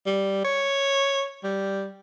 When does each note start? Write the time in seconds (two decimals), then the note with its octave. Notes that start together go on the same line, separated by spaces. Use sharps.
0.07 G3
0.44 C#5
1.43 G3